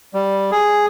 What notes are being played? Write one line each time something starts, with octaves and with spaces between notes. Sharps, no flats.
G3
G#4